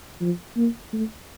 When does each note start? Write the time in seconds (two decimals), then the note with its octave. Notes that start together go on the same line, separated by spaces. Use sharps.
0.21 F3
0.57 A#3
0.93 A3